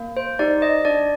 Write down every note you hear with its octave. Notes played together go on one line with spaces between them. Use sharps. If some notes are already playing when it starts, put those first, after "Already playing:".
Already playing: A#3
C5
D#4 G4 D5
D#5
D4 D5